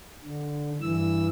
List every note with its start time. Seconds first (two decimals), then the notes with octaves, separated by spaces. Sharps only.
0.24 D3
0.81 G2 E3 E6